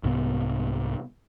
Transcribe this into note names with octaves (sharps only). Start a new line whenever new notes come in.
C2 G#2 C3 B3